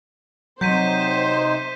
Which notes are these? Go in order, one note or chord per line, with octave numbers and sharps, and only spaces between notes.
C3 F#3 D#4 C5 G6 B6 D#7